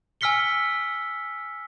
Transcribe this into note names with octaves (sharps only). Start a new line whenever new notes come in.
G#5 E6 F6 B6 C#7 G7